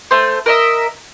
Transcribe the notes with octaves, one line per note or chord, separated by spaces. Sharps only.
A3 C5
A#4 D#5 E5